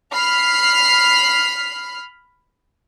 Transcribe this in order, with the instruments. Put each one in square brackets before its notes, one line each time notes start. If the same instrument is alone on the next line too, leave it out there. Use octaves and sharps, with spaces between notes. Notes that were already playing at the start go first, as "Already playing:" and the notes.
[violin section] B5 F6 C7